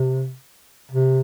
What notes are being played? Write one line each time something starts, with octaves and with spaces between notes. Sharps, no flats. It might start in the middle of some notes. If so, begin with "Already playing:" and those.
Already playing: C3
C3